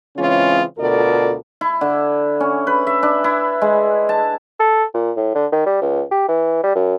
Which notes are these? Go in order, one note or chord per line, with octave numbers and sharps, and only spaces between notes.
C#3 E3 G#3 C4 C#4 F4
D2 B2 F4 A4 A#4 D5
E4
D3
C#4
B4
E5
D4
E4
G#3
A5
A4
A#2
A2
D3
D#3
G3
C#2
G4
E3
G3
F#2